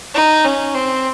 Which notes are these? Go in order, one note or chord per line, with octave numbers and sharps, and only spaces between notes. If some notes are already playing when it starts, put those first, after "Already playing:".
D#4
C#4
C4